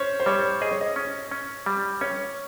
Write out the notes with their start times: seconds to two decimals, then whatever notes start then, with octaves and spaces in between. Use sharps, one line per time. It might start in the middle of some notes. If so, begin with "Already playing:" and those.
Already playing: C#4 C5 C#5
0.20 C5
0.26 G3 C#5
0.61 G#4 D#5
0.71 C#5
0.81 D#5
0.96 C#4
1.31 C#4
1.66 G3
2.01 C#4 C#5